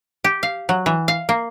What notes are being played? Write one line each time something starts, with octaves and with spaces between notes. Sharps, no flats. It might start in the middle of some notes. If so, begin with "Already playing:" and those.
G4
F5
F#3
E3
F5
A#3